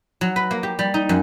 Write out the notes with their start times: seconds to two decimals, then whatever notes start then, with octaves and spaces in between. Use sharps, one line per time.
0.21 F#3
0.36 B4
0.51 A#3
0.63 G4
0.79 G3
0.94 D#4
1.09 F#2